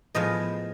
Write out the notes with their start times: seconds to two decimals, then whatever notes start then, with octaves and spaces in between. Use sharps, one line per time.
0.14 A2 F3 G#3 B3 D#5